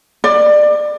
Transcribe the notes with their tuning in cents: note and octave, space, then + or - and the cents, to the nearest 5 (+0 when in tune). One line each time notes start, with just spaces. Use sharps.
D5 +25